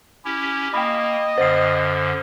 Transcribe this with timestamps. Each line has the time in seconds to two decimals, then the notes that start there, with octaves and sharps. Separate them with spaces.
0.25 C#4 E4 G4
0.74 A#3 D#5 G5 B5
1.38 F#2 D3 C5 C7